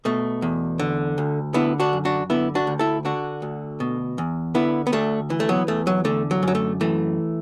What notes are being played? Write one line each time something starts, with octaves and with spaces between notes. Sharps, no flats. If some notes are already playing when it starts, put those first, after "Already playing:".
B2 A3
E2
D3
D2
D3 B3 E4
D4 F#4
F#2
D4 F#4
D3 B3 E4
D4 F#4
D2
E4 A4
D3 D4 F#4
D2
B2
E2
D3 B3 E4
B3
D2 A3 D4
E3
A3
F#3 B3
E2 A3
F#3
D3 A3
F#3
F#2 F#3
A3
E3 A3